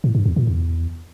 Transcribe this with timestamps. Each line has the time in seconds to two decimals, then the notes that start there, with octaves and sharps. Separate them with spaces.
0.04 A2
0.15 G2
0.26 E2
0.36 A#2
0.47 E2